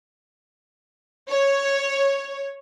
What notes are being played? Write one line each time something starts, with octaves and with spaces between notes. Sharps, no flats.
C#5